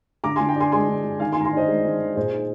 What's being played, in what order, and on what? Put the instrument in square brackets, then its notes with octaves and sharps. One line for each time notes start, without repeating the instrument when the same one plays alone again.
[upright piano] D3 A#5 D6
D3 G#5 C6
G5 A#5
D4 G#5 C6
G#3 G#5 C6
D3
D3
D#3 F5 G#5
G#5 C6
D#3 A#5
G#5 C6
D4 C5 D#5
G#3
D#3
D#3
A#2 G#4 C5
D#4